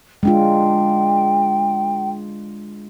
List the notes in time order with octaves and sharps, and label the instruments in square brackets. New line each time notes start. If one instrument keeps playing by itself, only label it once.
[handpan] G#3 D4 F4 [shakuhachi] G5